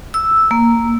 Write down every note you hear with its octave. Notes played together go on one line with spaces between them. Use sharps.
E6
A#3